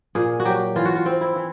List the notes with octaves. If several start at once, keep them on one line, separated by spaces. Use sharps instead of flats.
A#2 G#4
F#4
F#3 G4
E3 F4
F#4
F4
C4
E4
E3